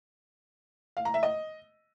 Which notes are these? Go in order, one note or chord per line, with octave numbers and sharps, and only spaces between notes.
F5
A#5
E5
D#5